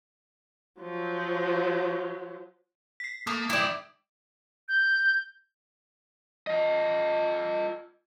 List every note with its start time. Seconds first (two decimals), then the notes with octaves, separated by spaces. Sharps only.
0.81 F3 F#3
3.00 B6 C7
3.27 A3 A#3 D#6
3.50 G#3 E4 D5 G5
4.69 G6
6.47 F4 D#5